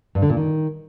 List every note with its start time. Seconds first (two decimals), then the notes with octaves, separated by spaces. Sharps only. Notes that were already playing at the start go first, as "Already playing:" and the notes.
0.15 G2
0.22 D3
0.30 A#2
0.37 D#3